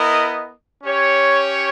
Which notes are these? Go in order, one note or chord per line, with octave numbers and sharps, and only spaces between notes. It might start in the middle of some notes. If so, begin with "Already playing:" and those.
Already playing: B3 E4 A#4 D#5
C#4 G4 C#5